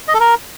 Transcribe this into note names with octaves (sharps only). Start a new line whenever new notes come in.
D#5
A4
A#4